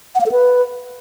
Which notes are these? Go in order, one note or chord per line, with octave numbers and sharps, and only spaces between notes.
F#5
F5
A4
B4